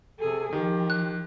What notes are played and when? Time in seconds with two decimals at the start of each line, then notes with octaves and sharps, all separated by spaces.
0.19 C3 G#4 A4
0.53 D#3 F3 G4
0.90 F#6